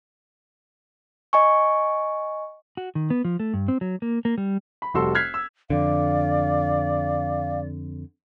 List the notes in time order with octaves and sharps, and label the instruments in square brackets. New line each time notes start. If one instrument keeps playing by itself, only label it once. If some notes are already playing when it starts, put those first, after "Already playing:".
[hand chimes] D#5 G#5 C#6
[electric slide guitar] F#4
D#3
B3
F3
A3
G2
C4
F#3
A#3
A#3
G3
[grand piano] B5
F1 G3 F#4 A4 C6 E6
F6 F#6 G#6 B6 C7
E6
[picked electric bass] F2 D3 [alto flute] D5 [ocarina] F5